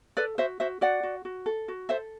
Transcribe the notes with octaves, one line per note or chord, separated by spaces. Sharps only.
A4 B4 D5
F#4 C5 E5
F#4 C5 E5
F#4 D5 F#5
F#4
F#4
A4
F#4
A4 C5 E5